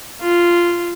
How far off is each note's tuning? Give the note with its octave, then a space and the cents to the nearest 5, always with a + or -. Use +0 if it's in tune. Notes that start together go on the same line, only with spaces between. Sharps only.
F4 -10